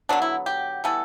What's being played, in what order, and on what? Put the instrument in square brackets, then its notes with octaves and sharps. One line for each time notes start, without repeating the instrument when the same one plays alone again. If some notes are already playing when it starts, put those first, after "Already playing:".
[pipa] D3 F#3 B3 D4
E4
G4
E3 G3 B3 A4